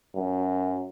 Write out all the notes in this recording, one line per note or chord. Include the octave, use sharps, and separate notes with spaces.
F#2